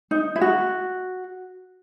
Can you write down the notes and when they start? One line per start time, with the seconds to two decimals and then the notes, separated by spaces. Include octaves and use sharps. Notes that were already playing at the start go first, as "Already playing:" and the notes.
0.11 D#4
0.36 E4
0.41 F#4